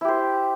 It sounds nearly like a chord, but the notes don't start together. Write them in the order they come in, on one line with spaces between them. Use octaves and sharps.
E4 G4 C5